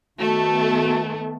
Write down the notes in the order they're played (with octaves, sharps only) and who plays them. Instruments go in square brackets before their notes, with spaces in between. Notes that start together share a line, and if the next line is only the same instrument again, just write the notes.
[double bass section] D#3 B3 [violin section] A3 [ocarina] F#4